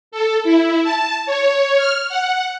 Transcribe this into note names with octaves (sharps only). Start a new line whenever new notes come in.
A4
E4
A5
C#5
F6
F#5